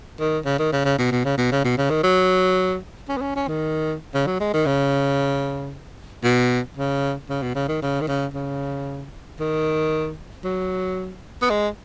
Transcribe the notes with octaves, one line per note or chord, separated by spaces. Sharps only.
D#3
C#3
D#3
C#3
C#3
B2
B2
C#3
B2
C#3
B2
C#3
D#3
F#3
C#4
B3
C#4
C#4
D#3
C#3
F#3
G#3
D#3
C#3
B2
C#3
C#3
B2
C#3
D#3
C#3
D#3
C#3
C#3
D#3
F#3
B3
G#3